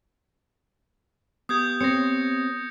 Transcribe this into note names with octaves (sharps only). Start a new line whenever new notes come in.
B3 G4 D#6 G6 G#6
C4 C#5 A#6 C#7